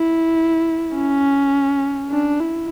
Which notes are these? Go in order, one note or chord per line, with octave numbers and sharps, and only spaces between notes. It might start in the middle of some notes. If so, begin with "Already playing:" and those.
Already playing: E4
C#4
D4
E4